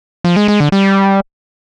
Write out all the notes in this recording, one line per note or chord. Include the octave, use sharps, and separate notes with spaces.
F3
G#3
G#3
D3
G3